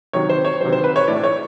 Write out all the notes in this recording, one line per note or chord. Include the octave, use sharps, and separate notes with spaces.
C3 D#3 F#3 C#5
C5
C#5
C3 D#3 F#3 C5
C5
B4
C#5
A2 E3 A3 D5
C#5